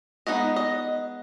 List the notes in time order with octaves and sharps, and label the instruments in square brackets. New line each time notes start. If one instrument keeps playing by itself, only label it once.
[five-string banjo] G#3 B3 D#4 D#5
D#5